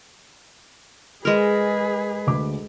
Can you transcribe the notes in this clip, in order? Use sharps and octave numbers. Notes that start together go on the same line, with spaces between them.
G#3 G#4 A#4 B4
D2 D6